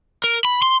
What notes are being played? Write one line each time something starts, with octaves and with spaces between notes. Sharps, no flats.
A#4
B5
C6